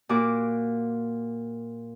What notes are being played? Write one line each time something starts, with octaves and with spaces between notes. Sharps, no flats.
A#2 F#4 D6